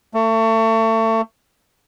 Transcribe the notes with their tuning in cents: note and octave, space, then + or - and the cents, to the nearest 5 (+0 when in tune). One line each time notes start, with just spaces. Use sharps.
A3 +30